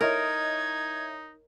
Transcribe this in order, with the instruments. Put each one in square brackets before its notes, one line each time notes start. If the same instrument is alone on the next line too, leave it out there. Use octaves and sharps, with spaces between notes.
[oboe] D#4 [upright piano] E4 C#5 D#5 [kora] A#4 [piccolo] G#6